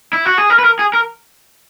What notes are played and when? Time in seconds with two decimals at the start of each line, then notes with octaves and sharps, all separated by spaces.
0.13 E4
0.25 F#4
0.38 G#4
0.50 A#4
0.59 B4
0.64 A#4
0.79 G#4
0.93 A#4